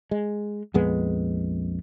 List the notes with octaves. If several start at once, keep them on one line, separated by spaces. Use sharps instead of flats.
G#3
A#1 F2 G#3 B3